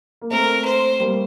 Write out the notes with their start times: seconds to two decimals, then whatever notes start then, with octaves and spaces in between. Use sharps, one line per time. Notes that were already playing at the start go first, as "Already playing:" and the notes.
0.21 A#3
0.31 A3 C4 A#4
0.65 C5
1.00 G3 A#3